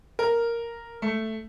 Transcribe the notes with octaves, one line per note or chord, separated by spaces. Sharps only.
A#4
A3